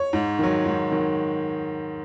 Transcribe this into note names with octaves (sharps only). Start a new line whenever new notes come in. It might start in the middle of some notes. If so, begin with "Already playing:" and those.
Already playing: C#5
G#2
D#3 F#3
G#2
D#3 F#3